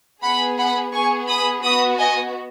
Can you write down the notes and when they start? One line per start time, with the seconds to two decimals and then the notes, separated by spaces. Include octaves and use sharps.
0.22 B3 G#4 F#5 B5
0.58 F#5 B5
0.93 B3 G#4 G#5 C#6
1.28 B5 D#6
1.63 B3 F#4 B5 D#6
1.99 D#5 G#5